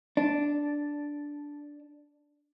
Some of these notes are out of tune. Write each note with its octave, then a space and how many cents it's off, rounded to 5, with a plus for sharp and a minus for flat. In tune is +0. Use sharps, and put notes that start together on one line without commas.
D4 -5